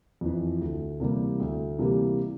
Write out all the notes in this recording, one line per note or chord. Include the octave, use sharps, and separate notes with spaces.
F2 E3
D2
C3 E3 G3 A#3
D2
C3 E3 G3 A#3